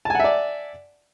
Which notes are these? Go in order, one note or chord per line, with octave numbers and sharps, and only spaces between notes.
D5 E5 F#5 G#5 A5